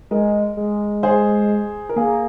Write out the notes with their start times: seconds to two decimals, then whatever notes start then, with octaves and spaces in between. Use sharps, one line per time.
0.11 G#3 A#4 D#5
0.57 G#3
1.03 G#4 C5
1.89 A#4
1.96 A#3 G#4